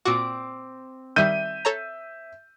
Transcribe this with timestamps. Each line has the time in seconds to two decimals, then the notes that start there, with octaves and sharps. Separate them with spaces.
0.05 A#2 C4 F#4 D6
1.16 D#3 G3 E5 G6 D#7
1.65 A4 C#5 A#5